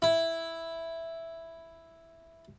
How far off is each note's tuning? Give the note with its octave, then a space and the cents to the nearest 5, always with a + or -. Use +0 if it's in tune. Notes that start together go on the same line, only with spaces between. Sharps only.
E4 +0